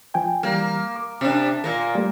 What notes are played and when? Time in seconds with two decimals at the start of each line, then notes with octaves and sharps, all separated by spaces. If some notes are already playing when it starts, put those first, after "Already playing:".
0.14 F3 G5 G#5
0.43 E3 G3 A#3 G6
0.96 D6
1.21 C3 D4
1.64 A#2 A#3
1.95 G3 A3 A#3